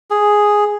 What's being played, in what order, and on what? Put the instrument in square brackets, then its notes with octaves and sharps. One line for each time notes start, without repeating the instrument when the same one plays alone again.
[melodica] G#4